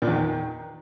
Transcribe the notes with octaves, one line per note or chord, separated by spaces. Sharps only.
A#2
E2
D#3